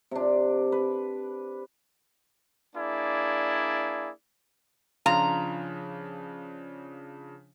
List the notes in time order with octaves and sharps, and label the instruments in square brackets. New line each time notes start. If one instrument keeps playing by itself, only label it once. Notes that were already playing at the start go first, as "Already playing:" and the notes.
[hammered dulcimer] C3 D4
B4
[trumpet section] A#3 D4 E4 G#4 D5
[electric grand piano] C#3 F3 D4 [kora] F4 [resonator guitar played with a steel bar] A#5